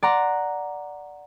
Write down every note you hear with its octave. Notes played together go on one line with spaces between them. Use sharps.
D5 F#5 A#5 C6